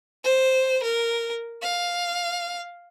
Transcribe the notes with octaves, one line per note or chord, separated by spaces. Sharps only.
C5
A#4
F5